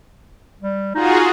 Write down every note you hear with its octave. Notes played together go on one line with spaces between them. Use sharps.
G3
D#4 F4 F#4 G#4